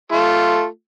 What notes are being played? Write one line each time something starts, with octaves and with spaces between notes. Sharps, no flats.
A3 F4